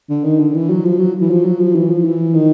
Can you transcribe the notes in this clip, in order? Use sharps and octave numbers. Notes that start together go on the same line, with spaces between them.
D3
D#3
D3
E3
F#3
F3
F#3
E3
F3
F#3
F3
E3
F3
E3
D#3